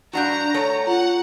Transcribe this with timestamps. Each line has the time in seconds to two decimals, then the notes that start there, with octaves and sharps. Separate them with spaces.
0.13 G2 D4 F#4 F#5 A#5 G6
0.54 A3 A4 C#5
0.87 F4 F#5 A#5